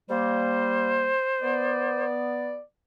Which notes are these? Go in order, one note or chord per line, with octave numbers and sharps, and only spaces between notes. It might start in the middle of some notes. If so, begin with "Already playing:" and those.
G3 A#3 C5
B3 D5